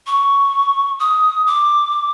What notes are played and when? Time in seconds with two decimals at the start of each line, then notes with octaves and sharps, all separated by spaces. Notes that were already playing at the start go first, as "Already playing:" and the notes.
0.07 C#6
1.00 D#6
1.47 D6